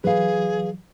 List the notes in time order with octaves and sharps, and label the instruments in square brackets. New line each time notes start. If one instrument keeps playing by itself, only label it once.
[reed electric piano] E3 F#3 [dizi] G#4 [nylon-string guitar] B4 F5